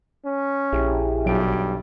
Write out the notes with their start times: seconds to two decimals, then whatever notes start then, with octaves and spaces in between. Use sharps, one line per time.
0.25 C#4
0.73 A#1 E4 G4 G#4
1.26 B1 G2 F#3 D7